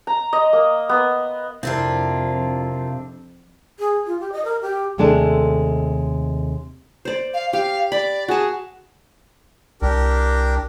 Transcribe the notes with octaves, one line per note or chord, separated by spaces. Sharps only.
A#5
D#5
A#3
B3
F2 C3 C4 D4 E4 F4 A#4
G#4
F4
G4
D#5
A#4
G4
D#2 C3 G#3 A3 D4 A4
C5 D5
F5
G4 F5
D5 B5
F#4 G#4 A5
C2 D4 G4 A#4